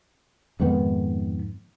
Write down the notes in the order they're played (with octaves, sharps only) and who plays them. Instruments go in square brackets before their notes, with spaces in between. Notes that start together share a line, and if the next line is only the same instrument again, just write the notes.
[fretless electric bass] F2 G#2 D#3 B3